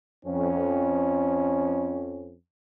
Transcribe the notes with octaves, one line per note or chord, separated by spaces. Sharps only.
F2 C#4